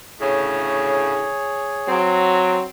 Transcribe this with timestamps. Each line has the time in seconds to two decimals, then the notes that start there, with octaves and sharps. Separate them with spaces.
0.20 D2 A2 C#3 G#4 C#5
1.88 F#3 C4